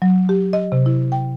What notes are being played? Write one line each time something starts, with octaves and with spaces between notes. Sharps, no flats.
F#3
G4
D#5
C3
E4
G5